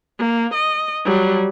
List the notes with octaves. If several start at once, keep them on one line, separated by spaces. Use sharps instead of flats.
A#3
D#5
F#3 G3